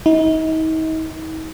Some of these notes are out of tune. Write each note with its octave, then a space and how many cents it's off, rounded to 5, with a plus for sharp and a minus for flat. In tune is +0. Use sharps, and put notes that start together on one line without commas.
D#4 +40